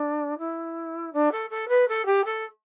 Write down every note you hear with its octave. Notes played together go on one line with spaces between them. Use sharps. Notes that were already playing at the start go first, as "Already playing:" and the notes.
Already playing: D4
E4
D4
A4
A4
B4
A4
G4
A4